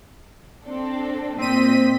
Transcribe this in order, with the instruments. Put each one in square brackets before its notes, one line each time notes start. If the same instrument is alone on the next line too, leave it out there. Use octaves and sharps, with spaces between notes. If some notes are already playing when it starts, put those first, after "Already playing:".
[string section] C4 D4 A4
[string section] A#2 D#5 B6 [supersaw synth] C4 D#7